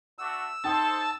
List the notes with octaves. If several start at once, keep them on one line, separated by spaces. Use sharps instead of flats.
A3 D4 F#4 E6
D#4 A4 C5 G5 A5 D#6